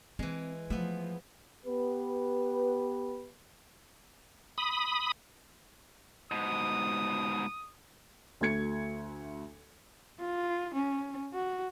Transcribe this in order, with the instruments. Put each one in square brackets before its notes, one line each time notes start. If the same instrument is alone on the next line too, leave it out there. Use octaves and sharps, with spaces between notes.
[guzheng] E3 G#3 [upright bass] C4
[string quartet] F3 [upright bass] A3 [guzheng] B3 E5
[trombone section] B3 G4 B4
[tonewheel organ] B5 D#6
[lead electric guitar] G#2 B2 [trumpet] D#6
[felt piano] D2 A3 F#4 G#6 C#7
[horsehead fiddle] F4
C#4
F#4